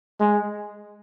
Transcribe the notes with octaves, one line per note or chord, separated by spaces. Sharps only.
G#3